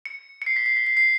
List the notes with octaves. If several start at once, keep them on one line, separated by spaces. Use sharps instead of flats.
C#7
C#7
C7
B6
C7
B6
C7
C7